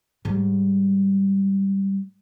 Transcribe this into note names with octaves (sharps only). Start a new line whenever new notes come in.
G#2 G3